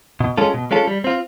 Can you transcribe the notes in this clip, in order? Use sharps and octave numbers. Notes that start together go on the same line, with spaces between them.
B2
G#3 C#4 F4 A4
B2
G#3 C#4 F4 A4
G3
C4 F4